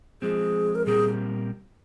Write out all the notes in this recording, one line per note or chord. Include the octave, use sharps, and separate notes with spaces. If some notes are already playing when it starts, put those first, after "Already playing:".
F3 G#3 C4 G#4
A#4
A#2 G3 C4 G4 G#4 A#4